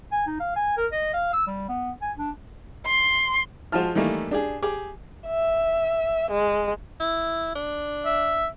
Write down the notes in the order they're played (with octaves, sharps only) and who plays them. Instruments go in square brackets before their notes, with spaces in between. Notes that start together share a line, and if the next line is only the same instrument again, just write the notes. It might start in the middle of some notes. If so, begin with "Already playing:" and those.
[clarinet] G#5
D#4
F5
G#5
A#4
D#5
F5
E6
G3
B3
G#5
D4
[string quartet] C6
[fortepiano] F3 G#3 F4 F#4 A5 F6
D#3 E3 G3 A3 A#3
D4 G4 G#4
G4 G#4 D6
[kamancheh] E5
G#3
[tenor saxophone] E4
D4
[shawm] E5